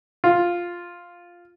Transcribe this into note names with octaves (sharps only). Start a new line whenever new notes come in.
F4